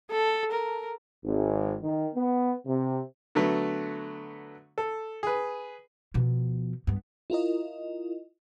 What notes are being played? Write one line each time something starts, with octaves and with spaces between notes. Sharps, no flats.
A4
A#4
G#1
D#3
B3
C3
D3 F#3 A3 B3
A4
G#4 B4
B2 F3
G2 B3
E4 F4 A#4 D#5